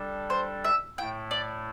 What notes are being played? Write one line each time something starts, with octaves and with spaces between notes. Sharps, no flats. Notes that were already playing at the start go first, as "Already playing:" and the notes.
Already playing: G3 D4 A4
C5
E5
A2 A3 E4 G5
D5